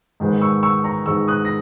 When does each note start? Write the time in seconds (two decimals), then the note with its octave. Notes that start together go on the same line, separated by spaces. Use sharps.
0.20 G#2 D#3 G#3 B3
0.41 C#6 E6
0.63 C#6 E6
0.84 A#5 C#6
1.06 G#2 D#3 G#3 B3 C#6 E6
1.28 D#6 F#6
1.45 A#6